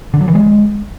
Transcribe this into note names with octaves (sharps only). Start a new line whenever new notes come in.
D3
F#3
E3
G#3